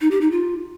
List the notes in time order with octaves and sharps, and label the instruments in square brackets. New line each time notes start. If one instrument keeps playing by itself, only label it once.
[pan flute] D#4
G4
D#4
F4